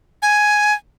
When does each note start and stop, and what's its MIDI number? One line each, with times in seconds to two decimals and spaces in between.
0.22 0.73 80